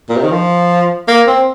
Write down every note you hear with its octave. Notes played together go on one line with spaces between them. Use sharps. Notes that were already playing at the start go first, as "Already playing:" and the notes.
A#2
C3
D#3
F3
A#3
C4